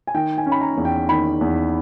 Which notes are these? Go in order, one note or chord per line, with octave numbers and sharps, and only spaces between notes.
G#5
D#3 G5
G#5
C#4
B5
A#5
E2
G5
D#3 B5
E2